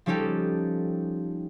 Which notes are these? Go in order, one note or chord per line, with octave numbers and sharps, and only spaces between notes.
F3 G3 C#4 D#4 G4 A4